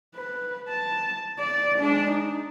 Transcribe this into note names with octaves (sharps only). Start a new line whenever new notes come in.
B4
A5
D5
G#3 D4
D#4